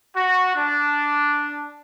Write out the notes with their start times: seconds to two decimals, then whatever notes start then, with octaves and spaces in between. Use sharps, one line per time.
0.16 F#4
0.56 D4